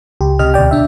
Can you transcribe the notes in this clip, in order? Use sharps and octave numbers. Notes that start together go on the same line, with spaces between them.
C#2 G4
C#2 C3 G4 D#5 F6
D2 B2 D5 G5
D4 E5